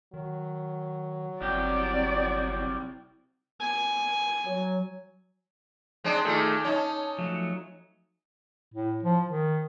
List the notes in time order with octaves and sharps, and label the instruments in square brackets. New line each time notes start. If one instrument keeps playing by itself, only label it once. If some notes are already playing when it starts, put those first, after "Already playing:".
[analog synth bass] D#3 [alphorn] F#3
[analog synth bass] G1 [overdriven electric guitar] C2 G4 [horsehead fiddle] C4 D5
[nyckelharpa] G#5
[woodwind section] F#3
[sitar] G#3 C4 D4
[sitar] A#2 D#3 [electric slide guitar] A3 G#4 A4
[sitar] C#4 D#4 [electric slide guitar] A5
[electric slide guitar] F3 F#3 A3
[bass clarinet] A2
F3
D#3